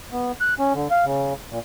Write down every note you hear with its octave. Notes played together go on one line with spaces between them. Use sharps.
B3
F#6
C#4
D3
F5
C#3
A#2